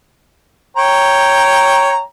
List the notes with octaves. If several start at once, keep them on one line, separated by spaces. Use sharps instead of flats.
C#5 G5 A#5